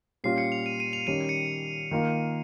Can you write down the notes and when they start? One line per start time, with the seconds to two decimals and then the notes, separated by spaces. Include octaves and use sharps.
0.24 A#2 G3 C#4 F4 C7
0.38 C#7
0.52 F7
0.66 D#7
0.80 D#7
0.93 F7
1.07 D#3 G3 C#4 D#7
1.29 C#7
1.91 D#3 A#3 F4